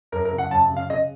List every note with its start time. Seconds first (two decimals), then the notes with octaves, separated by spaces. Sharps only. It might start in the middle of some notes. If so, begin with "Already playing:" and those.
0.12 F#2 A#4
0.25 A#4
0.32 C#3
0.38 F#5
0.51 F#2 A5
0.70 C#3
0.77 F5
0.89 C#3 D#5